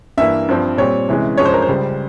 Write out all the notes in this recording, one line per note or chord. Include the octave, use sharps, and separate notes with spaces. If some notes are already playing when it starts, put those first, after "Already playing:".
G2 E3 A#3 E5
G2 F3 C4
A#2 G3 C4 C#5
C3 E3 G#3 C#4
G2 F3 G#3 C#4 C#5
C5
A#4
C5
C#2 C#3 G3